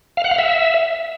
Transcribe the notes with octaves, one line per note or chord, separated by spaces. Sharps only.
F5
F#5
F5
E5